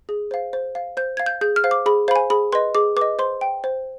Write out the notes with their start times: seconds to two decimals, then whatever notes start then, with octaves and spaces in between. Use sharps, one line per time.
0.09 G#4
0.31 C5 F5
0.53 C5
0.75 F5
0.97 C5 G6
1.17 F5 G#6
1.26 G6
1.41 G#4 G6
1.56 F6
1.64 C5 F5
1.71 D6
1.86 G#4 B5
2.08 C5 F5 B5
2.16 G#5
2.30 G#4 B5
2.52 B4 D#5 C6
2.75 G#4 D6
2.97 B4 D6
3.01 D#5
3.19 C5 C6
3.41 G5
3.64 C5